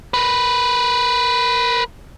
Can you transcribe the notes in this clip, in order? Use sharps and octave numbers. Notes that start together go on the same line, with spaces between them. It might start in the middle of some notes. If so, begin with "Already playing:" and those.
A#4 B4